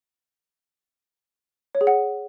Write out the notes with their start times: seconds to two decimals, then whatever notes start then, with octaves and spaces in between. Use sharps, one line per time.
1.75 C#5
1.81 G#4
1.87 F#5